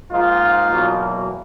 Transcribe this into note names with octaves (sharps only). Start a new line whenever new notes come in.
G#2 F3 A#3 D#4 F4
E2 B2 F#3 A#3